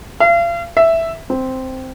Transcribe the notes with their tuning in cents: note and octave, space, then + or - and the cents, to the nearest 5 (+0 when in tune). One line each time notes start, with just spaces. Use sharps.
F5 -40
E5 +0
C4 -5